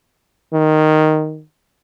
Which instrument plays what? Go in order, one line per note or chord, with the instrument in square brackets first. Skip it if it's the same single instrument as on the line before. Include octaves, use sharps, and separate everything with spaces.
[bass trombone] D#3